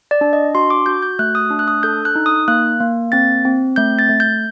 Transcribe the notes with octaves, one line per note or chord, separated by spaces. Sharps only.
D5
D4
D#5
F#4 C6
D6
F#4 G6
G6
A3 F#6
D#6
D4
F#6
D#6
A4 G6
F#6
D#4
D#6
A#3 F#6
A#3
C4 A6
C4
A3 G6
A6
A3
G6